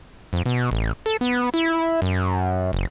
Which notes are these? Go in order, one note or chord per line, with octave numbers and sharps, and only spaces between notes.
F2
B2
A1
A4
B3
E4
F#2
F#1